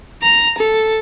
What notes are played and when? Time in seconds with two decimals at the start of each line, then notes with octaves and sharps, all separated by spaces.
0.23 A#5
0.58 A4